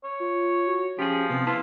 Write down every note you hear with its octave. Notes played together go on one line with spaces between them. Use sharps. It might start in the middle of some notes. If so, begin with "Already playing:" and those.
C#5
F4
F#4
F3 C#4 G4 G#4
C3 B3 C7
E4 F4 B4 A5